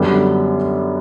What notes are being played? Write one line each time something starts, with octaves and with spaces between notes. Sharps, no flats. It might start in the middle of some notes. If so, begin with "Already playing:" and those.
Already playing: F#2 D3 G3 B3